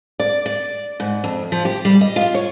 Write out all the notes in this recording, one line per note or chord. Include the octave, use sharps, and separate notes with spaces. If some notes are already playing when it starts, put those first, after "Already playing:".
D5
D5
G#2
F2
F3
G4
G3
D#5
F4
C#5